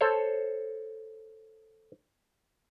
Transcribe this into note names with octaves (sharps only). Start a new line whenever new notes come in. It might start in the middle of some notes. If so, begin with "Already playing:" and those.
A4 C5 C#5